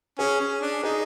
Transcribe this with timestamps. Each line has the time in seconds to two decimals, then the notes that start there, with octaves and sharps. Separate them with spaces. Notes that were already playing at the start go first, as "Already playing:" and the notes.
0.19 C#4 G#4
0.40 C#4
0.62 D4
0.83 D#4 G#4